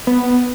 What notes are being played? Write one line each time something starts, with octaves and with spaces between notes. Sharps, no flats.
B3